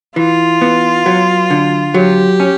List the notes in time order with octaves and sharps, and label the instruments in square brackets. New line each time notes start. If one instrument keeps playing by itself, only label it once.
[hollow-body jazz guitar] E3 [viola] F4
[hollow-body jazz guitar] B3
F#3
D3
[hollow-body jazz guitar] F#3 [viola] G4
[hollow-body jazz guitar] C#4